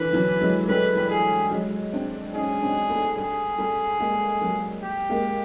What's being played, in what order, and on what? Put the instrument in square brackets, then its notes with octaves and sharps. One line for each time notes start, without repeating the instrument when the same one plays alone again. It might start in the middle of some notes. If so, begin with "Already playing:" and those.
Already playing: [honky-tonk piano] D3 E3 [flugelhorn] B4
[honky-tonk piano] E3 F#3
F#3 G#3
[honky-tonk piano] G3 A3 [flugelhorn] B4
[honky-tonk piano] G3 A3
[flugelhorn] G#4
[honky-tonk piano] F#3 G#3
C4 D4
[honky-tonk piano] C#4 D#4 [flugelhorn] G#4
[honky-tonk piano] C#4
C4 D4
A3 B3
[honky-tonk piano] G3 A3 [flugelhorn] G#4
[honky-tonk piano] G3 A3
G#3 A#3
F#3 G#3
[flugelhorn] G4
[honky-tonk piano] G#3 A#3